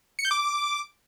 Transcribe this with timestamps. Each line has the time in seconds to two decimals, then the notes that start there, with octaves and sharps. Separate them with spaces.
0.19 C#7
0.25 G6
0.31 D6